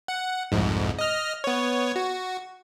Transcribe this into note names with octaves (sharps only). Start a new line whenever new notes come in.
F#5
C2 F2 G#2
D#5 F6
B3 C#5
F#4